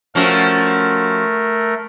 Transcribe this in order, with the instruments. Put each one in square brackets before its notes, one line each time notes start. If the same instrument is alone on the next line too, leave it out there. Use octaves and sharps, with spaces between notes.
[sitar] F3 C#4 F#4 [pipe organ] A3 A#4